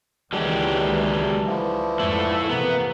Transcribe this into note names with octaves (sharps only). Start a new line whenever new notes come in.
C#2 D#3 E3 F#3 G#3 D4 G4
D3 E3 F3
F2 G#2 A3 E4
C3 E3 A#3 B3